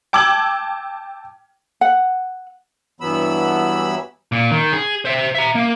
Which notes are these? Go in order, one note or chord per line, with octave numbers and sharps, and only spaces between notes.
G5 A5 D6 E6 G#6 F#7
F#5
G2 E3 F#3 B3 B5 E6
A#2
D#3
G#4
C5 E5
E5 A#5
A#3